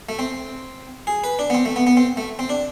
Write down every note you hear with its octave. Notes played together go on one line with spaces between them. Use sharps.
A3
C4
G#4
B4
D4
B3
C4
A3
B3
B3
C4
A3
C4
D4